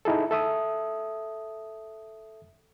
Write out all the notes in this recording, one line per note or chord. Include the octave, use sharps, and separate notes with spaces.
D#4 E4 G#4 A4
A4 E5 D#6